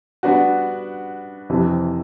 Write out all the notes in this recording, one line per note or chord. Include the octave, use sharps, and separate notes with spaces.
G3 B3 D4 F#4
F2 C3 E3